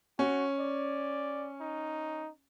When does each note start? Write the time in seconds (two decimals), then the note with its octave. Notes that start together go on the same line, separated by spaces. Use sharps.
0.19 C#4 F#4
0.60 D5
1.60 D#4